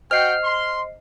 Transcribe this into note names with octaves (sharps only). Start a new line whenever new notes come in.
F#4 C5 D#5 F#5 G5 F6 C7
C6